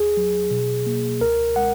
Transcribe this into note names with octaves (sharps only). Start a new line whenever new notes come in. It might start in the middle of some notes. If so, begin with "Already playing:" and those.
Already playing: D#2 G#4
F#3
B2
A#3
C#2 A#4
G#3 F#5